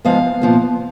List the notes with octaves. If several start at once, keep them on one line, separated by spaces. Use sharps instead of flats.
G#2 F3 B3 F5
A#2 F3 B3